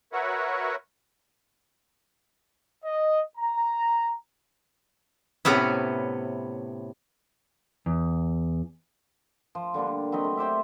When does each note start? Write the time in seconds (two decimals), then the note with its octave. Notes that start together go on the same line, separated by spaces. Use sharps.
0.13 F#4 A#4 B4 C#5 E5 F#5
2.85 D#5
3.38 A#5
5.45 A2 C3 B3 C#4 E4
7.86 E2
9.55 F3
9.74 D3 G3 A#3 D4
10.12 F#3 C4 B4 D#5
10.24 A3
10.37 G4 C5 D5 E5